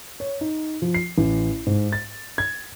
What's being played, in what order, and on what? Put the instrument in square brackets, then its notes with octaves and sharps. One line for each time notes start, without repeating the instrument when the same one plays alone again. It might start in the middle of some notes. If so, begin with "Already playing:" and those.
[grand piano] C#5
D#4
F3
C7
A1
G#2
A6
G#6